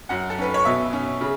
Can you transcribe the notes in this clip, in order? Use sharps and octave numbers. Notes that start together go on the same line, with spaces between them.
F#2 F#5
A4
C#4 B4
C#5
B2 E5
C#4
C#3